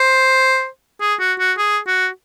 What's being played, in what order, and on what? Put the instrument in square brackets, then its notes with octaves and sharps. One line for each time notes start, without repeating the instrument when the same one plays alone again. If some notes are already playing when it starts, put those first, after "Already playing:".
Already playing: [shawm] C5
G#4
F#4
F#4
G#4
F#4